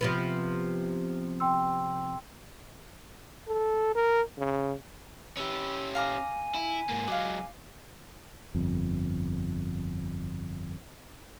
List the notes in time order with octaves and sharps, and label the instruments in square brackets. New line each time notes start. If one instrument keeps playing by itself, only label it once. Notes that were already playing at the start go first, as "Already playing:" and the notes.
[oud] C3 F3 B3
[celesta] G5 C6 E6
[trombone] A4
A#4
C#3
[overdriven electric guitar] C#4 G4 [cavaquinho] B4 [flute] E6
[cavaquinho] F5 A#5 D6 [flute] G#5
[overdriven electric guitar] E4
G#2 A#3
[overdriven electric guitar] F#3 G#3 [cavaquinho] F5 D6
[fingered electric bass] G1 F2